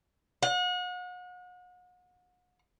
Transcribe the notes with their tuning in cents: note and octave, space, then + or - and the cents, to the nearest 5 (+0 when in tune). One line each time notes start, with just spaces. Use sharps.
F#5 -40